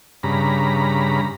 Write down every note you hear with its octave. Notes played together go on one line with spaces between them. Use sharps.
G2 C#3 A#5 B5